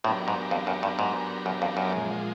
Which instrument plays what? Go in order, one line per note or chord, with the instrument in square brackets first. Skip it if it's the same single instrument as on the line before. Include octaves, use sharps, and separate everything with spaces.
[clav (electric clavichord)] A2 [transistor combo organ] F#3 B3 D4 G4 A#4
[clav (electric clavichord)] G#2
F2
F#2
G2
G#2
F#2
F2
F#2
[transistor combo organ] A#2 F3 G#3